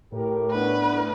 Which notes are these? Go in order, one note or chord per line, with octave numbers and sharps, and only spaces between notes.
A2 G4 A#4
B3 C#4 D4 B4